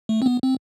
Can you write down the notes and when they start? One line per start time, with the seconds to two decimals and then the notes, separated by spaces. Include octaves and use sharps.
0.09 A3
0.22 C4
0.26 B3
0.43 C4